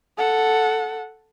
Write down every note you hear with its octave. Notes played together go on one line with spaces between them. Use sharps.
A4 F#5